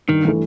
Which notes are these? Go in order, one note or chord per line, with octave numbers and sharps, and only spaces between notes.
G2 D#3
E3 A3